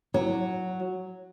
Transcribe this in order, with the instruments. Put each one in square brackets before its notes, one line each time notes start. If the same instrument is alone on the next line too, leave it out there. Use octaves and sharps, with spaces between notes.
[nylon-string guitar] F#3